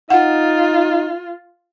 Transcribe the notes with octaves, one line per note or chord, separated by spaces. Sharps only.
D#4 F4 F#5